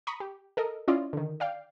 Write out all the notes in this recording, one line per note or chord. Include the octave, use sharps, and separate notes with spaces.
A#5 B5 C#6 D#6
G4
A4 A#4 D#5
C#4 E4 F4 D5 D#5
D3 D#3
D5 F5 G5